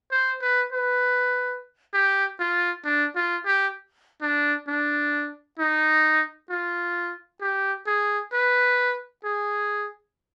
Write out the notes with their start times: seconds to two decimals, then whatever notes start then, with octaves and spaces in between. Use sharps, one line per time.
0.11 C5
0.42 B4
0.73 B4
1.94 G4
2.40 F4
2.85 D4
3.16 F4
3.46 G4
4.22 D4
4.68 D4
5.59 D#4
6.50 F4
7.41 G4
7.87 G#4
8.33 B4
9.24 G#4